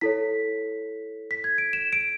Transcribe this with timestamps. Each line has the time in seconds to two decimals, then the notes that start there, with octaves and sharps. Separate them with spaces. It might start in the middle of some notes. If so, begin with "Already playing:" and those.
0.01 E4 A4 C#5 B6
1.31 B6
1.44 G#6
1.58 D7
1.73 E7
1.93 D7